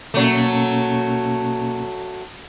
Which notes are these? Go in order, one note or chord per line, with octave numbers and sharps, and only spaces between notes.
B2 F#3 A3 A#3 C#4